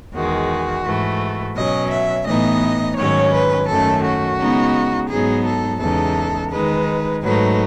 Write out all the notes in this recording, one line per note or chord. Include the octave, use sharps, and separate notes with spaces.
E2 D#3 G#3 F#4
G#2 E3 A3
B2 F#3 C#4 D#5
E5
A2 E3 B3 D#4 D#5
G#2 D#3 F#3 C#4 C#5
B4
F#2 D#3 A3 C#4 A4
F#4
C#3 G#3 B3 D#4
G#2 F#3 B3 D#4 G#4
A4
E2 C#3 G#3 D#4 A4
D#3 G#3 D#4 B4
G#2 F#3 A3 D#4 B4